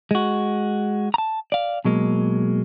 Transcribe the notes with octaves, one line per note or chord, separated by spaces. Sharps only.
G#3 F#4
A5 A#5
D5 F5
B2 F#3 G#3 A#3